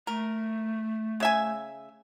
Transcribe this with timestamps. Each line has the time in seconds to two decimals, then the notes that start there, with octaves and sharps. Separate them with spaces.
0.07 A3 A#4
1.20 C#3 E5 G#5